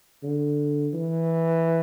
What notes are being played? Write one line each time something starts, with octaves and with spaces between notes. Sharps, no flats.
D3
E3